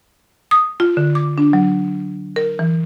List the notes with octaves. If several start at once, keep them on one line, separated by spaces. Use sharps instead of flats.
D#6
F4
D3
D6
D4
F#3
A#4
E3